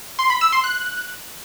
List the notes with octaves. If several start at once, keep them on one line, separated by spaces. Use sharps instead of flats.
C6
B5
E6
C6
F#6